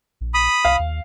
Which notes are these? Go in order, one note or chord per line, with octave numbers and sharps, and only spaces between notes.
A#1
B5 D#6
C2 F5
D#2